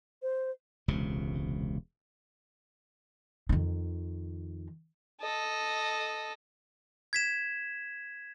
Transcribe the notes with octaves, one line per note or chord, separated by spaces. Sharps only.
C5
E1 C#2 C3
F2 D#3
A4 D#5
G#6 B6 E7